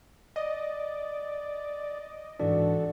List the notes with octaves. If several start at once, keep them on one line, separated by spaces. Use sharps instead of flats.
D5 D#5
G#2 E3 D4 F#4 A4 D5